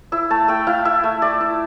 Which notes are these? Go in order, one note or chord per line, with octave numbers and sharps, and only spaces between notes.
E4 E6
A3 A5
A3 G5
E4 F5
E4 E5
A3
A3 D5
E4